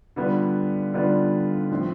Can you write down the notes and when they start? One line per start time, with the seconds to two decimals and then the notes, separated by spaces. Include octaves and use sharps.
0.16 D3 G3 B3 F4
0.93 D3 G3 B3 F4
1.70 A2 F3 C4